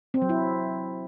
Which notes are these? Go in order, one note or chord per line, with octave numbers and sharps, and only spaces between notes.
C4
F#3
E4